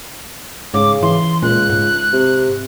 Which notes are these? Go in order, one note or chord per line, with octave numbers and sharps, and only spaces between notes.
G#2 C#3 D6
E3 C6
C#2 A#2 F#6
G#2
C3